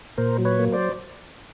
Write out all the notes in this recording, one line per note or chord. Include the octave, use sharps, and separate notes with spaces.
A#2 A#4 C5
F#3
B4 C#5
A#3
C5 D5